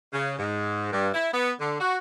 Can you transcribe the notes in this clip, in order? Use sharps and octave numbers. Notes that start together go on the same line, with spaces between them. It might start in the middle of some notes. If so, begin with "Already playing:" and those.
C#3
G#2
G2
E4
B3
D3
F#4